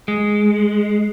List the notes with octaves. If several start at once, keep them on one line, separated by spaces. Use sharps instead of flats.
G#3